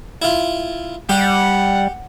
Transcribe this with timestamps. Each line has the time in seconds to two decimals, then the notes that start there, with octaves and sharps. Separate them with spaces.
0.22 E4 F4
1.09 G3 G4 F#5